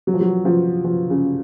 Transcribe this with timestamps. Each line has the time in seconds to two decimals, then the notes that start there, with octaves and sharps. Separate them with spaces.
0.07 F#3
0.14 F3
0.20 F#3
0.45 F3
0.84 F3
1.10 C#3